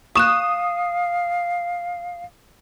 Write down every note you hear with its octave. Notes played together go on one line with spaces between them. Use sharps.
F5 C#6 D#6 F#6 E7